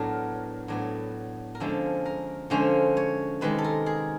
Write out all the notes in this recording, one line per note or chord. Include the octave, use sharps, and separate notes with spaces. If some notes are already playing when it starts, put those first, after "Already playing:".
Already playing: A2 F#3 B3 D4 A#4
A2 F#3 B3 D4
A#4
D3 F3 G#3 C#4 A4
A#4
D3 F3 G#3 C#4 C5
C#5
C3 D#3 G#3 B4
A4
A#4
G#4